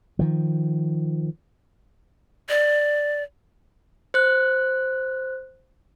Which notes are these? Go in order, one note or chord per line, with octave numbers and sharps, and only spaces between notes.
D#3 F3
D5
C5 F#6